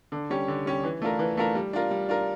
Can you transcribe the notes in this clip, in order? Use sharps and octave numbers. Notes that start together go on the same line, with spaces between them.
D3
G3 C#4 G4
D3
G3 C#4 G4
E3
A3 D4 F4 A#4
E3
A3 D4 F4 A#4
G3
D4 F4 A#4
G3
D4 F4 A#4